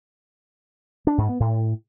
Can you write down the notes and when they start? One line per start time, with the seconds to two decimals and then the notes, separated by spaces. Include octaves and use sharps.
1.07 D4
1.18 G#2
1.29 B3
1.40 A2